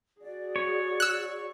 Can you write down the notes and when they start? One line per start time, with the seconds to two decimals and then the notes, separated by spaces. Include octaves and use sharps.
0.21 F#4 G#4 D5
0.56 C#5
1.00 E6 F#6